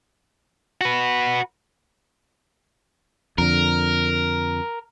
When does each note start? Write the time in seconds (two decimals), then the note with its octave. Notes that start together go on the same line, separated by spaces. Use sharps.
0.81 F#4 B4
3.38 F2 D3 A#4